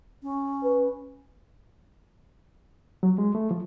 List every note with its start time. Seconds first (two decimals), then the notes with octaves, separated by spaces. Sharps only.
0.23 C#4
0.64 B4
3.03 F#3
3.18 G#3
3.35 A3
3.51 F3